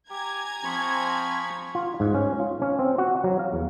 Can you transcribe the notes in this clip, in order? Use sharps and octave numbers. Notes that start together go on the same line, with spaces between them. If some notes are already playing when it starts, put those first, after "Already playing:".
G4 G#5 A#5 G#6
F3 C4 B5 C#6
F4
G#2
C#4
F4
C#4
C4
F#4
F#3
F5
E2